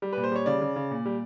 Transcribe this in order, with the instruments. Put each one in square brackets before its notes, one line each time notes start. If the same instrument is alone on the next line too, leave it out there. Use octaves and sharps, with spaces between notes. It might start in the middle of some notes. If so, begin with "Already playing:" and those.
[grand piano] G3
A#2 B4
C5
G3 C#5
C#3 D5
C#3
C#3
A#2
G3